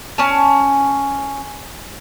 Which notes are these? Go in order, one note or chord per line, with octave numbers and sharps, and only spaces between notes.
C#4 G#5 A5